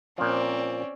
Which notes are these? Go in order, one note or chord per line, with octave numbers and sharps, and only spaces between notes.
A#2 F3 C4 C#4 D5